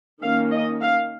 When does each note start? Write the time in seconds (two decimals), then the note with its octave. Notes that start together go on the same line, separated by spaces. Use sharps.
0.22 D#3 A#3 C#4 F5
0.51 D#5
0.81 F5